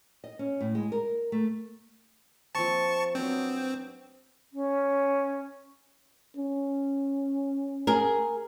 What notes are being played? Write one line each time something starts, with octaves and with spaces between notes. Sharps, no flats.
D#5
C#4
A2
G#3
A#4
A3
F3 A#3 C4 A5 C#6
F#3 B3 C4 D4
C#4
C#4
G#4 A#4